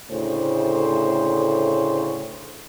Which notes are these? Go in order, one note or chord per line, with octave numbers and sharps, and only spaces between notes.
D2 A2 C#3 C5